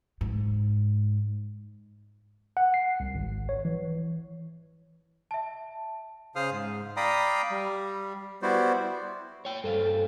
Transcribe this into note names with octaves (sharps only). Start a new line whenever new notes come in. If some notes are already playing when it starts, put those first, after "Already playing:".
G#2
F#5
C7
C2
G#1
C#5
E3
E5 A5
C#3 G#4 C5 F5 D#6 F6
G#2
D5 F5 G5 A#5 B5 D#6
G3
G3 B3 E4 F#4 C5 D5
C#5 G5
G2 A4 C5 F5